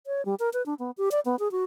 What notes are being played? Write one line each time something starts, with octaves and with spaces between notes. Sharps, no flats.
C#5
G3
A#4
B4
D4
B3
G4
D5
B3
G#4
F#4